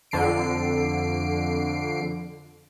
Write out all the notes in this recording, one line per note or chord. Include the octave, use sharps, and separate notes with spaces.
F2 D3 C7 D7